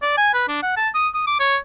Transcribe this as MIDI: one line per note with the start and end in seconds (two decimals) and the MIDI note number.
0.02 0.14 74
0.17 0.31 80
0.34 0.48 71
0.48 0.59 62
0.63 0.74 78
0.77 0.89 81
0.95 1.09 87
1.14 1.25 87
1.27 1.36 86
1.40 1.57 73